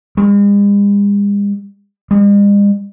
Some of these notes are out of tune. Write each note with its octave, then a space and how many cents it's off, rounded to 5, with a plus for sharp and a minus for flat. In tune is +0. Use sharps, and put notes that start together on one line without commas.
G#3 -45
G#3 -45